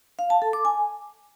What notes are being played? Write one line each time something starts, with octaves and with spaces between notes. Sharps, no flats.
F5
A5
A4
D6
G#5